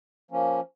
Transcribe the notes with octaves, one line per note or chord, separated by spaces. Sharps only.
F3 A#3 C#4